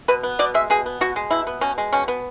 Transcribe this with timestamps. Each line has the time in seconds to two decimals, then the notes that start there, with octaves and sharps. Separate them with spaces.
0.08 B2 B4
0.23 B3
0.39 B2 D5
0.54 G#3 E5
0.70 B2 G#4
0.86 B3
1.01 B2 F#4
1.16 G#3
1.30 B2 E4
1.47 B3
1.61 B2 C#4
1.78 G#3
1.93 B2 C#4
2.08 B3